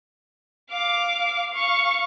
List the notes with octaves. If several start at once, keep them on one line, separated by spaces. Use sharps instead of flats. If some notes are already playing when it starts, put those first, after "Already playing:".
F5 D6
F5 C#6